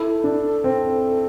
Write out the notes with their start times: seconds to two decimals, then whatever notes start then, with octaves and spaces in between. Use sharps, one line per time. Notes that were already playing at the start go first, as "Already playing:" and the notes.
Already playing: E4 A4
0.24 D4
0.64 C4